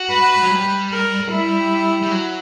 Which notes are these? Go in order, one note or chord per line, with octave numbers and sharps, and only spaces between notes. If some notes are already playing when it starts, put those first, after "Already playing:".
Already playing: F#4
B4
F#3
G3
A#4
E4
G3
F#3